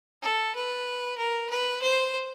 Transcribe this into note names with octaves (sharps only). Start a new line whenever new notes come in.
A4
B4
A#4
B4
C5